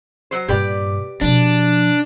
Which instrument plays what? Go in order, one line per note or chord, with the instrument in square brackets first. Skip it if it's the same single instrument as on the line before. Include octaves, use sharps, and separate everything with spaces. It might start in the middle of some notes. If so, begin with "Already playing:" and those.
[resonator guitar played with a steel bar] F#3 C5
[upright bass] G2 A#2 [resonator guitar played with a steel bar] G4 B4 D5
[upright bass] B2 F3 [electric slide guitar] D4